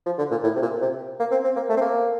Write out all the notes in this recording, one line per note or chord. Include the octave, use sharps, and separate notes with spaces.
F3
D3
A#2
A2
C3
A#2
C3
A#3
C4
C4
A#3
A3
C4
A#3